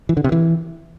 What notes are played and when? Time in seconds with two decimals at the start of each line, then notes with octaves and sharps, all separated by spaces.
0.09 E3
0.17 D3
0.24 C3
0.32 E3